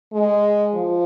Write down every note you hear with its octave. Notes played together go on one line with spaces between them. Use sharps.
G#3
F3